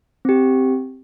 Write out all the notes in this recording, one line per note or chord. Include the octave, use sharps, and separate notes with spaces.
C4 G4